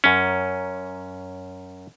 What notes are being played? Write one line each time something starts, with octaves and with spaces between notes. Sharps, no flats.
F#2 C#4